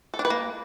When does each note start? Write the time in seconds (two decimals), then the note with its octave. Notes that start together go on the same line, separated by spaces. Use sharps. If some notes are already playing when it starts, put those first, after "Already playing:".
0.14 A4
0.19 D4
0.25 B4
0.30 A#3